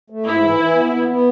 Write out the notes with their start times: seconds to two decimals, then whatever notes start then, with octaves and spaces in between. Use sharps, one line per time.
0.10 A3
0.26 G#2 E4
0.42 E3
0.59 E3
0.75 B3
0.93 B3
1.09 B3